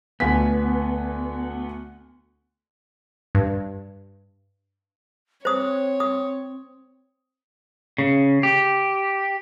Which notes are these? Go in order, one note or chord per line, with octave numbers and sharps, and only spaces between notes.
D2 B3 G#5 B6
G2
C4 C5 C#5 D#6
D#6
C#3
G4